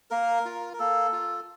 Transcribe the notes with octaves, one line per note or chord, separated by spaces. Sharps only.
A#3 A#4
F4
A#4
A#3 A4
F4